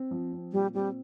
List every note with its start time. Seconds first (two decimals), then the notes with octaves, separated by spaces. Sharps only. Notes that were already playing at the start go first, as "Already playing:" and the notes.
Already playing: C4
0.11 F3
0.33 C4
0.53 A#2 G3
0.74 G3 C4